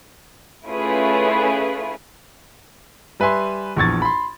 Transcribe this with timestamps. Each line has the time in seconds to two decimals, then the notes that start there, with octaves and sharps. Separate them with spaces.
0.66 A3 C#4 E4 F4 G#4 B4
3.20 G3 B4 E5 G#5 C6
3.76 A#1 E2 C#6 G#6 A6
4.02 B5 C6